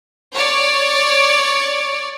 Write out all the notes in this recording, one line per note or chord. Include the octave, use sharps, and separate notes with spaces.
C#5 D5